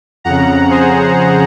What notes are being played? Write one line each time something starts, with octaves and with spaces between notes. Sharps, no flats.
F2 C#3 F#5 A#5
G#4 C5